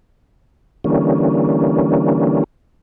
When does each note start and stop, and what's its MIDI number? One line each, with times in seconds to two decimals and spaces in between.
0.84 2.44 50
0.84 2.44 52
0.84 2.44 55
0.84 2.44 58
0.84 2.44 61